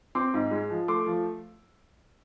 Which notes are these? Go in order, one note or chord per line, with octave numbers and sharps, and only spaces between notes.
C4 C6 D6
G#2
G#3
F3
A3 C6 D6
F3